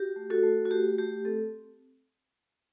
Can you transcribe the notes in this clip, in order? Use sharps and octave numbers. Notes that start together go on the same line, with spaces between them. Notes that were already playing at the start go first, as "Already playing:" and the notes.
Already playing: F#4 G4
A3
F#4 A4
A3
F#4
A3 G4
A3 G4
C4 A4